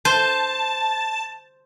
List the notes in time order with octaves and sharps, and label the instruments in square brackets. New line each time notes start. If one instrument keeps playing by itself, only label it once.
[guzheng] C5 [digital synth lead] A5